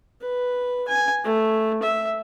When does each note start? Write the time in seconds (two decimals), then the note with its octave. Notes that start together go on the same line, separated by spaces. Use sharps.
0.21 B4
0.88 G#5
1.24 A3
1.83 E5